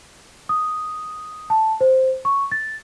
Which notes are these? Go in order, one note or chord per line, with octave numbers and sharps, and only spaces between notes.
D#6
A5
C5
C#6
A6